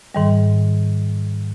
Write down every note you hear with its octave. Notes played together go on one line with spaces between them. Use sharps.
G#2 D#3 G3